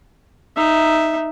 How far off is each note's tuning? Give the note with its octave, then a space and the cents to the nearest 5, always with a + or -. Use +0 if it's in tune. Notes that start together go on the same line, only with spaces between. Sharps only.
D#4 +0 E5 +0